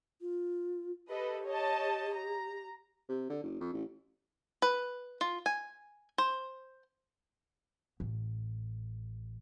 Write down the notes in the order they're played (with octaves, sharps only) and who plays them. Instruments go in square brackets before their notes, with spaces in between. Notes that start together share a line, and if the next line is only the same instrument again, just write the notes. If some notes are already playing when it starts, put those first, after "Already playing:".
[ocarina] F4
[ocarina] G4 [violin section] A4 B4 D#5
[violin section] C#5 D#5 A5
A#5
[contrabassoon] C3
D3
F#1
F2
A1
[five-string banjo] B4
F4
G#5
C5
[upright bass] A1